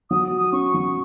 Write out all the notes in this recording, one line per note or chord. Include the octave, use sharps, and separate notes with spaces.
F#3 D#6
F#4
D#6
C#4 C#6
F#3